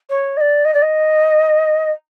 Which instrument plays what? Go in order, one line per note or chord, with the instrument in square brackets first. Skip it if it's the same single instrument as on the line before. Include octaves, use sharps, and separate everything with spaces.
[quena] C#5
D#5
D5
D#5
D5
D#5